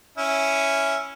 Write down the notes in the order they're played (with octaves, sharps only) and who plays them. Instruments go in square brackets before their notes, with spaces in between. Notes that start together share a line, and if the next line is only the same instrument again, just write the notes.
[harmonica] C#4 E4